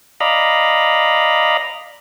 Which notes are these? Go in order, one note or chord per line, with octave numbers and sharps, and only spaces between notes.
D5 D#5 F5 A#5 B5